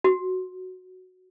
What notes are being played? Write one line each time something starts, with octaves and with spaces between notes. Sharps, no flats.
F#4